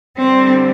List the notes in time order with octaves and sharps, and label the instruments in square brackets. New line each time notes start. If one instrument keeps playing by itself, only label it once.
[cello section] D3 G3 C4